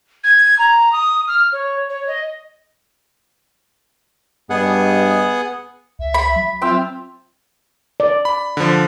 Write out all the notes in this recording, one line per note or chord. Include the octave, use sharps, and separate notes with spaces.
G#6
A#5
D#6
F6
C#5
C#5
D#5
G2 B3 G#4 D#5 F#5
C#2 E5
B5
F#3
C4 F4 E5 G5
D5
B5
D3 F3